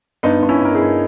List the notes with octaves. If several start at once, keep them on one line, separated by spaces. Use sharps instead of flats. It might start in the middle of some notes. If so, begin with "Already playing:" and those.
G2 B3 D#4
G2
C#4 E4
G2 A#4
E4 G#4
G2